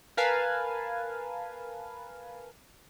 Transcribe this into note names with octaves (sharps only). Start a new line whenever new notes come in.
A#4 B4 F5 G#5 A5